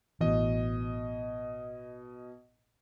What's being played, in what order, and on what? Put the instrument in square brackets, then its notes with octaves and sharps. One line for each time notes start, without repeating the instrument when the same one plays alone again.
[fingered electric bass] A1 E3 [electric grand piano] B2 D#5